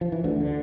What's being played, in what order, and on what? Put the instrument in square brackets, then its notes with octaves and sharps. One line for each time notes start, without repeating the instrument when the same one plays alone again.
[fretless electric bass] F3
E3
D2 D3
D3